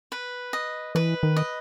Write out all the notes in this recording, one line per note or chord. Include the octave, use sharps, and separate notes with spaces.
B4
D#5
E3 B4
D#3
D#5